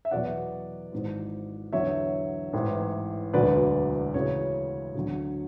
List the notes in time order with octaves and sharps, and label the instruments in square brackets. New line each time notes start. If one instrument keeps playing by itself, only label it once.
[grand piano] E5
E2 B2 F#3 D5 F#5
G#1 G#2 E3
E2 D3 F#3 C#5 E5
A1 G#2 E3
E1 D2 D3 F#3 B4 D5
D2 C#3 E3 C#5
D2 D3 F#3